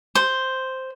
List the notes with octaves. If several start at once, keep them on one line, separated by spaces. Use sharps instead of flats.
C5